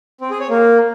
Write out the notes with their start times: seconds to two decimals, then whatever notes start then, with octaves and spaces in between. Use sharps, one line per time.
0.21 C4
0.31 G#4
0.40 C#5
0.49 A#3